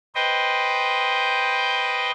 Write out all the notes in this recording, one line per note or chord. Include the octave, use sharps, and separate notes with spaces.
B4 C5 D#5 G5